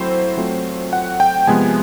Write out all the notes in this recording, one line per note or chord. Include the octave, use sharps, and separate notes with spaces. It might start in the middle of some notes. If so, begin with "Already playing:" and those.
Already playing: F#3 A3 C4 E4 C5
F#3 A3 C4 F4
F#5
G5
C3 F3 G#3 B3 G#5